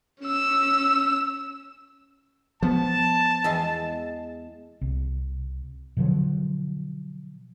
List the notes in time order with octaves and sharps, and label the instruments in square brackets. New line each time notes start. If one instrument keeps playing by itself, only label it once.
[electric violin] C#4 E6
[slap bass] F3 B3 [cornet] A5
[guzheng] E2 G#3 C6
[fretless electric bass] C2
B2 D3 F3 F#3